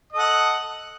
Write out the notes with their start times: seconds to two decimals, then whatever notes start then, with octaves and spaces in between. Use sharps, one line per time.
0.12 D#5
0.16 A4
0.19 F#5